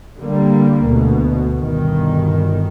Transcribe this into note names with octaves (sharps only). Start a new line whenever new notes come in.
D3 G3 A#3
D2 B2
G1 B2 D#3